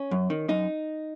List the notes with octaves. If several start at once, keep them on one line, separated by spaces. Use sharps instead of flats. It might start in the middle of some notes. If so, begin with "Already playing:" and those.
Already playing: C#4
F#2
D#3
F#2 D#4